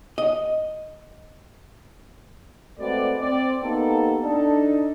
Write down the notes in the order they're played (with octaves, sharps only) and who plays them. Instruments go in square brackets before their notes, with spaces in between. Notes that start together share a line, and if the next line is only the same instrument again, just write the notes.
[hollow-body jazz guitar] D#5
[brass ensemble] G#3 A3 C4 F#4 B4 D5
C4 D5
A#3 B3 D#4 G4 A4
D4 D#4 A4